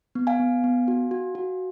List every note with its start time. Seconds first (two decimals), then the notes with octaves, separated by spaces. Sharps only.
0.15 B3
0.27 F5 G#5
0.40 B3
0.64 B3
0.88 F#4
1.11 F#4
1.35 F#4